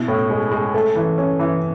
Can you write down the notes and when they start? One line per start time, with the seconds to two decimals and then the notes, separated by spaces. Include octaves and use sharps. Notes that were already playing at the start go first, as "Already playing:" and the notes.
Already playing: B2 E4
0.08 A2
0.30 G#3
0.51 G#3
0.74 A3
0.95 E3
1.18 C#4
1.39 E3